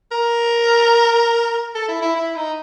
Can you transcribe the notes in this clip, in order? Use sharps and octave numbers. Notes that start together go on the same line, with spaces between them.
A#4
A4
E4
E4
E4
D#4